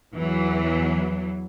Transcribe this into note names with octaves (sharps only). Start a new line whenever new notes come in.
E2 E3 F#3